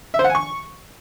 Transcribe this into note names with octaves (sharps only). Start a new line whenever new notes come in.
E5
C5
F#5
G#5
C#6